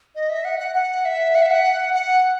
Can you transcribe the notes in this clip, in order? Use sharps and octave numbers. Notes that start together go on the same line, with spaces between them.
D#5
E5
F#5
F#5
F#5
E5
F#5
E5
F#5
F#5